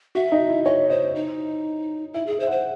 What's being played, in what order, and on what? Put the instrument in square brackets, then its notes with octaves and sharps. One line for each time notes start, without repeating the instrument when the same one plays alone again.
[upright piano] F#4 [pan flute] E5
[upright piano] D#4
E4
[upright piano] C#5 [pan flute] D#5
[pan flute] C5 [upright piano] D#5
[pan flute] D#4
[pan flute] E4 [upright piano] E5
[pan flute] G#4 [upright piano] E5
[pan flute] C5
[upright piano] E5
F#5
[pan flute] C5